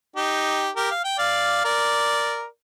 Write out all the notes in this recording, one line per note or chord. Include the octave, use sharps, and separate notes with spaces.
D#4 G4
G4 A#4
F5
G5
D5 F5
A#4 D5